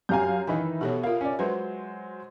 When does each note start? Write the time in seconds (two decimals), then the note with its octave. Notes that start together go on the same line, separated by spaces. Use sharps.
0.09 F#2 G4 F5 G#5 A#5 G6
0.47 D#3 E3 D#4 E5 G#5 B5
0.81 B2 G4 A4 C#5
1.03 F4 A#4 F5
1.21 C#4 D5
1.39 F#3 G#3 B4 C5